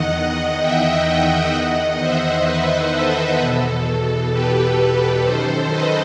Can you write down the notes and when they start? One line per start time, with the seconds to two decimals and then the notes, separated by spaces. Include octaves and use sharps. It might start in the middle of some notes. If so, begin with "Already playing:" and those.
Already playing: E2 D#3 D#5 F#5
0.61 E5 G5
1.54 E2 D#3 D#5 F#5
2.00 C5 E5
2.46 B4 D#5
2.92 A4
3.39 E2 B2
3.86 A4
4.31 G4 B4
5.23 F#2 D#3 A4 C5
5.70 B4 D#5